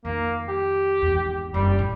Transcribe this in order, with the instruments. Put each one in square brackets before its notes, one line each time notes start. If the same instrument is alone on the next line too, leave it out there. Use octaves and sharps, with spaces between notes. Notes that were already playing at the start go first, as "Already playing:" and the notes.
[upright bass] F2 D#3 [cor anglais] A#3
[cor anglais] G4
[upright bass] G#1 E2
[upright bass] F#1 [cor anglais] G3
[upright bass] A2